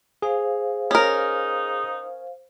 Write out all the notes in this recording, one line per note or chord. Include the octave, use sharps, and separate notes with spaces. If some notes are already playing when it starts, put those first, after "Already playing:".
G#4 C5 F5
C#4 D#4 A#4